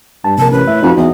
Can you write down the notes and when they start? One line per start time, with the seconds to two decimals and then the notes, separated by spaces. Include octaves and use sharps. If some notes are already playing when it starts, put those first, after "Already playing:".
0.24 G2 A5
0.38 A#1 C3 A#4 A5
0.51 A1 B4
0.68 A2 E5
0.83 F2 D#4 F#4
0.96 E2 D#5